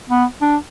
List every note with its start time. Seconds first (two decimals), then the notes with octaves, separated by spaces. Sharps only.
0.10 B3
0.41 D4